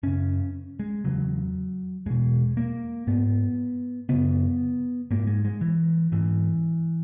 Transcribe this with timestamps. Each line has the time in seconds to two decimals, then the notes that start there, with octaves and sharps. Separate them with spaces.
0.03 F#2 C#3 C#4
0.80 G#3
1.04 E2 C#3 F#3
2.06 E2 B2 G#3
2.57 A#3
3.07 G#2 B3
4.09 F#2 C#3 B3
5.11 G#2 A#3
5.27 G#3
5.45 G#3
5.61 E3
6.12 G#2 E3